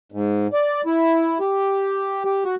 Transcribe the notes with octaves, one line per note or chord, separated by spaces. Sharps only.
G#2
D5
E4
G4
G4
F#4